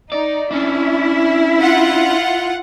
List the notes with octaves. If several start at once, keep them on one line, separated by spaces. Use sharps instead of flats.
D#4 D5
C#4 D4 E4
F4 F#5